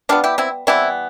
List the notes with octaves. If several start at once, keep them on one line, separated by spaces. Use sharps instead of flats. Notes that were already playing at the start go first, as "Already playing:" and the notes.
D3 G3 B3 D4 F4
E4 G4
C4 E4
E3 G3 B3 C4 E4